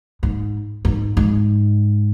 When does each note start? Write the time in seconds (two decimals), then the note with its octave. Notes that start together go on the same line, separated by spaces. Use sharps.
0.23 G#2
0.85 G#2
1.17 G#2